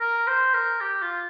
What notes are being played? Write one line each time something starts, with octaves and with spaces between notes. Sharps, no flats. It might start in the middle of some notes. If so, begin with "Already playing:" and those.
A#4
C5
A#4
G4
F4